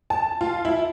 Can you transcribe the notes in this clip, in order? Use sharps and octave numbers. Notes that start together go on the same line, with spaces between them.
A5
F4
E4